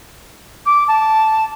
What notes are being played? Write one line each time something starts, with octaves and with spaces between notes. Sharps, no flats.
D6
A5